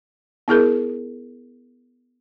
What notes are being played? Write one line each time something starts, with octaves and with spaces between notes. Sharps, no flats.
B3 E4 G#4 A#4